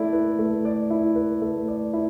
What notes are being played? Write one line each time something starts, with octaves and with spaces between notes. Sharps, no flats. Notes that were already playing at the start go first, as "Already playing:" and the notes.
Already playing: A3 E4 D5
B4
A3
D5
E4
B4
A3
D5
E4